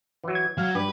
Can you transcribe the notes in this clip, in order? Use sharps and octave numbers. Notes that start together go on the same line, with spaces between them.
E3 F#3
G#6
F#3 F5
G2 G4 B4